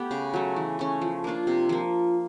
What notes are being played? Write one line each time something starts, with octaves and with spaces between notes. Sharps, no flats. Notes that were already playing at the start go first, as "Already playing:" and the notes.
Already playing: A3 B3 G4
C#3
F#3 A3
E3
A3 C#4
F3
A#3 D4 F4
C3
F3 A#3